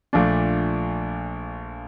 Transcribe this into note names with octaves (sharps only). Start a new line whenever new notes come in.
A#1 A#2 A3 D4